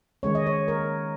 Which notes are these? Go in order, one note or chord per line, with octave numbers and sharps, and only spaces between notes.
D#3 G#3 C#4 C#5
D#5
C#5
A#4